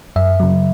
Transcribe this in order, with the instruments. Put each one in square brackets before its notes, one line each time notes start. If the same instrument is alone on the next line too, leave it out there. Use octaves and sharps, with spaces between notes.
[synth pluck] F#2 E5
C#3 F#3